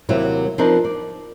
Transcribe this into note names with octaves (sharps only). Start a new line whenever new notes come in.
D#2 C3 F#3 A#3 C4 E4
F3 C4 D4 D#4 A#4 B4
D5